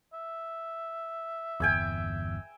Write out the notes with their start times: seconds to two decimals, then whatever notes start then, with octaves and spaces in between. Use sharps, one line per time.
0.13 E5
1.60 G1 E2 G5 G#5 E6